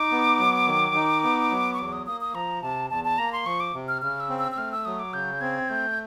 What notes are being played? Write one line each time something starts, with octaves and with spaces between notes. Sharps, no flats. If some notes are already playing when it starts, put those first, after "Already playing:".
Already playing: D#4 D6
B3
F#3
D#3
D#4
B3
F#3
C#6
E2 D6
D#6
A#3 D#6
D#6
F3 A#5
C3 A5
E2 A5
A5
A#3 A#5
C6
F3 C#6
D6
C3
F6
C#3 F6
E6
C4
E6
E6
A3 F6
E6
F#3 D#6
D6
C#3 G6
C4 G#6
A3 G6